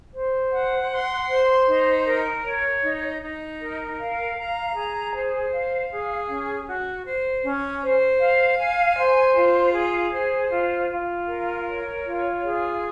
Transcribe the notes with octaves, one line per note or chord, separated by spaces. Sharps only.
C5
F#5
C6
C5
D#4
A#4
C#5
D#4
D#4
A#4
F5
A#5
G#4
C5
F5
G#4
C#4
F#4
C5
C#4
C5
F5
G#5
C5
F4
G#4
C5
F4
F4
A#4
C#5
F4
G#4